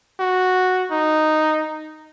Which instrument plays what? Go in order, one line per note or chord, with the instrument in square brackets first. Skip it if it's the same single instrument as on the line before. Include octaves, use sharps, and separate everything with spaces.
[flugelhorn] F#4
D#4